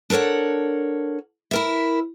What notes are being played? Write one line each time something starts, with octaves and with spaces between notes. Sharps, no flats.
D4 A4 A#4 C#5 F#5
E4 A#4 E5